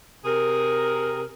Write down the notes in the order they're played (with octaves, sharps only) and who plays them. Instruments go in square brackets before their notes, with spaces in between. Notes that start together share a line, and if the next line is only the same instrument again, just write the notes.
[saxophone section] C3 G#4 A#4